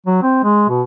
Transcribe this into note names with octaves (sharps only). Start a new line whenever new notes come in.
F#3
C4
G#3
B2